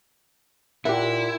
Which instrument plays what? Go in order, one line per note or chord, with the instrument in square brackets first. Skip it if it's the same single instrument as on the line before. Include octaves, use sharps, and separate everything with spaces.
[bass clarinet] A#2 [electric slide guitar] E4 [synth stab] G4 F#5 [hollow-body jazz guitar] A#4 E5